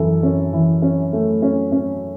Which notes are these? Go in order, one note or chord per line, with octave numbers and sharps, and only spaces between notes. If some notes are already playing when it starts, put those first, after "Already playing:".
Already playing: F#2 E3 A4
C#4
E3
C#4
A3
C#4
C#4